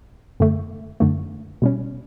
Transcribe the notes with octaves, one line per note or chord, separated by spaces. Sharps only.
F#2 D3 A3
F#2 D3 A3
B2 G3 C#4